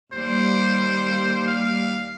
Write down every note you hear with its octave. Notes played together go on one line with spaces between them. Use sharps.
D#2 G3 A#3 C5
F5